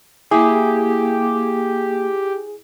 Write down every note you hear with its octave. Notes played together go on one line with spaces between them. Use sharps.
A#3 E4 G4 G#4